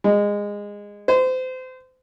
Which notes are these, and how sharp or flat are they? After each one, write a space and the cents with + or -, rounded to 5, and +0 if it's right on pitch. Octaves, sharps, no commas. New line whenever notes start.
G#3 -20
C5 -30